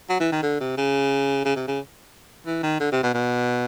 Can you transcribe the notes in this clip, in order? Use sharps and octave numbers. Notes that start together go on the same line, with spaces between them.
F#3
E3
D#3
D3
C3
C#3
C#3
C3
C#3
E3
D#3
D3
C3
B2
B2